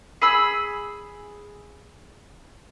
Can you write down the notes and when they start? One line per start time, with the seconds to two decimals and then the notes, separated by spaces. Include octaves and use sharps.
0.22 G#4 B5 E6